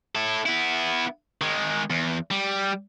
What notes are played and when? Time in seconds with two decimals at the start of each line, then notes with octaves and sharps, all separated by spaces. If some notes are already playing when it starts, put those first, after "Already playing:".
0.15 E4 A4
0.46 B3 E4
1.41 D#3 G#3
1.90 E2
2.31 G3